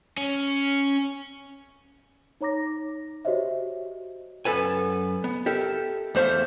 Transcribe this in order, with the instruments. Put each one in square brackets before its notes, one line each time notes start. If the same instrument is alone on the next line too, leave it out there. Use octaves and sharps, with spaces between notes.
[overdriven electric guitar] C#4
[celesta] D#4 C#5 A#5 D6 A#6
F#4 G4 C5 C#5 D#5 E5
[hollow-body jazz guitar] F#2 A4 B4 G#5
B3
G4 A4 A#4 E5
E2 A3 C5 E5 F5